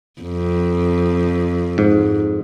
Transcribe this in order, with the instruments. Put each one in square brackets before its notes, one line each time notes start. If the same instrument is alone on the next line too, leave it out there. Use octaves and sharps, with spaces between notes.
[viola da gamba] F2
[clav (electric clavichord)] G#2